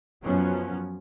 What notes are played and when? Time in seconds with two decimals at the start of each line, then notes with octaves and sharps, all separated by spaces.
0.22 F#2 F3 F#3 B3 C#4